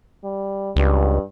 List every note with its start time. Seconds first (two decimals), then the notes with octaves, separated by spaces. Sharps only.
0.24 G3
0.76 C#2 G2